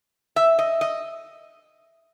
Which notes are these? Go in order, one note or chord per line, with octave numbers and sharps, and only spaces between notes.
E5
D#5
D#5